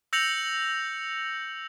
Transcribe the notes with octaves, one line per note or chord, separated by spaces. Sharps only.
E6 G6 A#6 C#7 F7 F#7